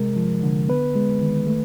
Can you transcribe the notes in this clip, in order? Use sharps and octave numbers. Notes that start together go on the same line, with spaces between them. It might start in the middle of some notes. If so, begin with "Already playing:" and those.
Already playing: C3 G#3 A#4
F3
D3
B3 B4
G#3
D#3
A3